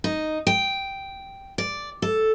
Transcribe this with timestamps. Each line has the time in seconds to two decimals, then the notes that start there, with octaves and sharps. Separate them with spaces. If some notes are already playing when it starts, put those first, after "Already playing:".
0.04 D#4
0.47 G5
1.58 D5
2.02 A4